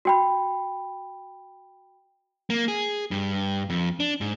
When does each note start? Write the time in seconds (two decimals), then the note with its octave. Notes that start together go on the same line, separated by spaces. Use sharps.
0.05 F#4 G5 B5
2.50 A#3
2.68 G#4
3.11 G2
3.70 F2
4.00 D4
4.21 G#2